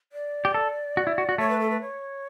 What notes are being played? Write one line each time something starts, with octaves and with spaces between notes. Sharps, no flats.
D5
G4
A4
F#4
E4
F#4
F#4
A3 C#5
B4
A4
B4
C#5